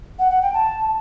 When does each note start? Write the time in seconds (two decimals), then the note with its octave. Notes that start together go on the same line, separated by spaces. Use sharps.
0.19 F#5
0.30 F#5
0.42 G5
0.54 A5